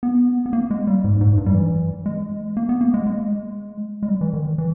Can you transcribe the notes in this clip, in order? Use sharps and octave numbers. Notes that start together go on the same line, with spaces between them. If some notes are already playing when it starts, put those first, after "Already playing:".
B3
B3
A#3
G#3
G3
G#2
G#2
G2
G3
E3
G#3
A#3
B3
A#3
G#3
G#3
G#3
G3
E3
D#3
E3
E3